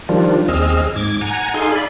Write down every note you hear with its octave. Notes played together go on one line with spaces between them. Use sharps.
D#3 F3 G3 D4 F4
D#2 C4 G#4 D#5 E6 F6
G#2 D6 G#6
F#5 G#5 A#5 G#6
D#4 G#4 A4 F5 G#5 C6
D5 B5